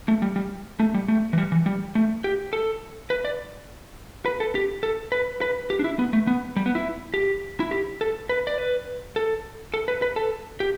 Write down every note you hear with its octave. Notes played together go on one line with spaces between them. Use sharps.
A3
G3
G3
A3
G3
A3
E3
G3
E3
G3
A3
G4
A4
B4
D5
B4
A4
G4
A4
B4
B4
G4
D4
E4
B3
A3
B3
G3
B3
E4
G4
E4
G4
A4
B4
D5
B4
A4
A4
B4
B4
A4
G4